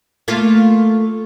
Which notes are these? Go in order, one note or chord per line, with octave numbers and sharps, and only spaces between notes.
A3 A#3 F4